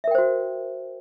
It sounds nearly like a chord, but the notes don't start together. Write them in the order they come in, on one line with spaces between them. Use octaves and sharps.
E5 A#4 G5 C5 F#4